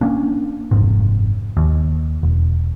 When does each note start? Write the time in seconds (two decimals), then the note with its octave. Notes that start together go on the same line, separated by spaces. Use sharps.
0.01 A#3 C#4 D4
0.71 F#1 F2 G#2 C3
1.57 D#2
2.23 E1